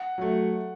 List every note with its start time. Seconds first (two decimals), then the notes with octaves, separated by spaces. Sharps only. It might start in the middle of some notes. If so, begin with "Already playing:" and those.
Already playing: F#5
0.18 F#3 A3